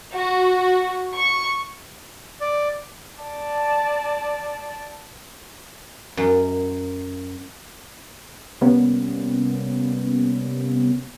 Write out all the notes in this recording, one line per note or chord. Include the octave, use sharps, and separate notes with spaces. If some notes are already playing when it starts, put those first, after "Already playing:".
F#4
C#6
D5
D5 A5
F#2
C3 G3 A#3 B3 C#4